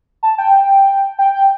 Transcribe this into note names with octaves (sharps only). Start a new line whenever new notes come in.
A5
G5
G5
G5